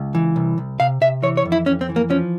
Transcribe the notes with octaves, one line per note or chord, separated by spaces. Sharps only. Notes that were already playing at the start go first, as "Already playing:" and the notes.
Already playing: C#2
E3
C2
C2
C3 F5
C3 E5
E3 C#5
C#5
F2
E4
F2 C#4
C4
E3
A#3
F3 C#4